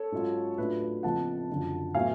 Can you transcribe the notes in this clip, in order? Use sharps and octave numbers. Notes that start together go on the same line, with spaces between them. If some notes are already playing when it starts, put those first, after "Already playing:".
Already playing: A4 C#5
G#2 F#3 C#4 F4
A2 F#3 A3 D4 F4 B4
B4
F2 C#3 F3 B3 F#5 A5
F#1 F#2 D3 F3
A2 F#3 B3 F5 G#5